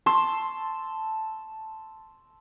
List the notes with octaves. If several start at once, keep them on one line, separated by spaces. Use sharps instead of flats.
A5 C6 E6